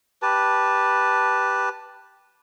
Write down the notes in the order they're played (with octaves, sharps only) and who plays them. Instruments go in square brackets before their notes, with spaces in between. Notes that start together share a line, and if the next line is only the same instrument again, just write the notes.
[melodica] G4 B4 A5